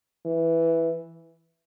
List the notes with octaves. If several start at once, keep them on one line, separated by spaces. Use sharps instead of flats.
E3